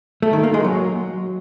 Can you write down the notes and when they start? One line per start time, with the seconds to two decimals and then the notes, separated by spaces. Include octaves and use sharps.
0.22 A3
0.33 D#3
0.43 A#3
0.54 G#3
0.64 F#3